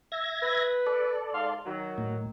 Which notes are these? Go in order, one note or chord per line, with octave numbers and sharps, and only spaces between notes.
E5 G#6 A#6
B4
A4 D5
G#2 F5 C6
D#3 F#3
A2